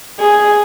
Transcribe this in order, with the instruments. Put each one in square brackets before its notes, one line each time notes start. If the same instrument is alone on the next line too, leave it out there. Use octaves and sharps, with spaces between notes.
[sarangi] G#4